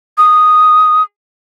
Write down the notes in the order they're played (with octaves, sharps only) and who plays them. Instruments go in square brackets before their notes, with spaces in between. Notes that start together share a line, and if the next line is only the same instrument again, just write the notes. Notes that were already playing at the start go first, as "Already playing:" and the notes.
[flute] D#6